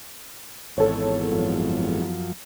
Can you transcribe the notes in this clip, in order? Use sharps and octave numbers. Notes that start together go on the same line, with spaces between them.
G#1 E2 A4 C#5
F#2 F3